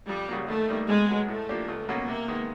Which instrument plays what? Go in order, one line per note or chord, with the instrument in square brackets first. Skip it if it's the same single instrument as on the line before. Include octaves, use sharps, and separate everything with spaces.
[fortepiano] F2 [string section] G3
[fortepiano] C#3 F#3 A#3
[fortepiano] D#2 [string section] A3
[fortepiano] D#3 G3 A#3
[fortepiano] B2 [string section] G#3
[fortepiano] F#3 B3
[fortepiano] A2 [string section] A3
[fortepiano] F3 A#3 D4 G4
C#2
B2 F#3 A#3 C#4
[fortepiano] C3 [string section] A#3
[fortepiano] D#3 G#3 B3